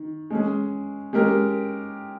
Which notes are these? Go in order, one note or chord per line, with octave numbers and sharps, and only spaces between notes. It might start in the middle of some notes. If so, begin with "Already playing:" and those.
Already playing: D#3
G#3 C#4 G#4
G#3 C#4 G4 A#4